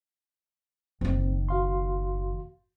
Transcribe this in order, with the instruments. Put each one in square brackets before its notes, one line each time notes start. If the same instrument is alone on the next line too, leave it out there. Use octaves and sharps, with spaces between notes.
[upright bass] F#1 D#3 [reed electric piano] C4
[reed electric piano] F#4 F5 C6